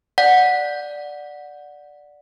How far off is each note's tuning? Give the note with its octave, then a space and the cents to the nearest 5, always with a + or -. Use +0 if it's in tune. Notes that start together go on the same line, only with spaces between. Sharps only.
D5 +0 F#5 -15